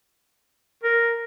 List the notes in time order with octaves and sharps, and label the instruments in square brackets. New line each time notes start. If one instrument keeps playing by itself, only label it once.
[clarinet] A#4